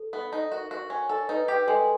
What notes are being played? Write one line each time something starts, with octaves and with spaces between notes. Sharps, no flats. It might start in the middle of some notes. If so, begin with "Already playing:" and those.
Already playing: A4
B3
D#4
F#4 A#4
F#4
C#4
A4
D#4 B4
G4 B4
G#3 A4